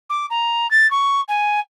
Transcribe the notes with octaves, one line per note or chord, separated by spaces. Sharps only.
D6
A#5
A6
C#6
G#5